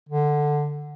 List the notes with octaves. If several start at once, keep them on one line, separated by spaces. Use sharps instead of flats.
D3